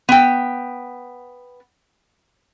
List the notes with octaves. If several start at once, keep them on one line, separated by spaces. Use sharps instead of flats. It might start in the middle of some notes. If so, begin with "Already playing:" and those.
B3 G5